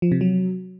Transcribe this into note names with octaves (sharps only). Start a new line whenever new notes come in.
F3
C3
F#3